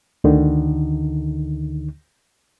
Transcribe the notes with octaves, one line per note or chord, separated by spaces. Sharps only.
D2 D3 D#3 D#4